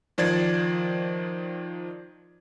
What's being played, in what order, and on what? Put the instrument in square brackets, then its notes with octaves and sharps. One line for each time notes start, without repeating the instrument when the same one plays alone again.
[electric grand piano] D#3 F3 C5 D5 G#6 A6